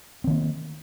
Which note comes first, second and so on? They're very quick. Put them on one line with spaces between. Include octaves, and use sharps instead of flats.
C4 D#3 A#3